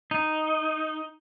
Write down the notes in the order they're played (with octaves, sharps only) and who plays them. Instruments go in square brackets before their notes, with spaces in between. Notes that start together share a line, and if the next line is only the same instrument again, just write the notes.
[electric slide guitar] D#4